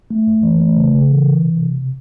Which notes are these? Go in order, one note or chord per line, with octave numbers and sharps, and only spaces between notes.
A3
F#2
E3
A3
C#3
C#3
E3
E3
C3
C3